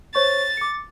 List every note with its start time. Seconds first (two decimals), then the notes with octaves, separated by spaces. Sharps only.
0.15 C5 C#5 C#6 A6
0.57 D6 C#7